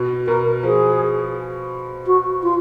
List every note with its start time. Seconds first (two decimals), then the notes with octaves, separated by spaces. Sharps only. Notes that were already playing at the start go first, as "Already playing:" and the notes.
Already playing: B2
0.27 B2 A#4
0.63 F3 G#4
2.06 F#4
2.43 F4